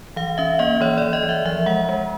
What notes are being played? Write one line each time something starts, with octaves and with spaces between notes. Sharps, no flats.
E3 F5
C#4 E5
A#3 D#5
E3 C#5
E3 D5
D#5
E3
E5
F3 E5
G#3 F#5
G#3